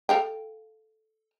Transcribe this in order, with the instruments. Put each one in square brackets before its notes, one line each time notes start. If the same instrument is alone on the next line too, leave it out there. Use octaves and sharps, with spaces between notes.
[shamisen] A4 F5 G5